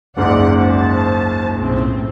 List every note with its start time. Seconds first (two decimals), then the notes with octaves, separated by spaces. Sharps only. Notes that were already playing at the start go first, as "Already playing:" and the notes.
0.17 F#1 C#2 G#2 D5 F#5
0.55 C5 A5
1.55 B1 A2 C4